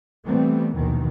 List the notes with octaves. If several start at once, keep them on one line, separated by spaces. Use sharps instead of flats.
E3 G3 A3 B3 C4
A#1 D#2 B2 D#3 E3